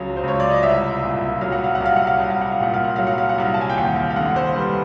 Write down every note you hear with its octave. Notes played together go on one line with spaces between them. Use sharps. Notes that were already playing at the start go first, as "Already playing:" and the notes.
Already playing: C#2 C#3 F#3
C5
C#2 C#5
D5
D#5
C2 E5
A#2
F#3 F5
F#5
F5
F#5
C2
F5
F#5
F5
C2 F#5
F5
F#5
F5
A#2 F#5
F5
F#5
F#3 F5
F#5
F5
F#5
C2 F5
A5
G#5
G5
D#2 F#5
F5
F5
D3 F#5
C5
G3 B4